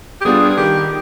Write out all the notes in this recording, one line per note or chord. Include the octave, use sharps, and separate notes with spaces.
G4
G3 B3 D4 F4 G#4
G#4
D#3 G4